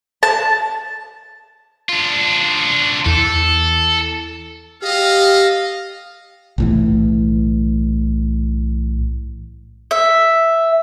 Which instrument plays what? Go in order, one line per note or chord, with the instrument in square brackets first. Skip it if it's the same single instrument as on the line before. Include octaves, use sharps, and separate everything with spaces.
[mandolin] A5
[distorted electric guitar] D4 F4
[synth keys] E2 [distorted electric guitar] A4
[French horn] G4 [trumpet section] A4 D#5 [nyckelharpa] F5
[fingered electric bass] B1 A2 E3
[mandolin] E5